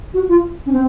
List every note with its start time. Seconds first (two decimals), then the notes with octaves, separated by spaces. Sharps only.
0.14 F#4
0.28 F4
0.66 C#4
0.72 C4